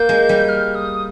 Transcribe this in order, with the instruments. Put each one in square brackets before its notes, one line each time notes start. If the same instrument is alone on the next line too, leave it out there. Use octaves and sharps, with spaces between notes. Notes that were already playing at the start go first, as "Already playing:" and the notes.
Already playing: [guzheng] A#3 [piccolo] G6
[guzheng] G#3
G3
[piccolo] F6
D#6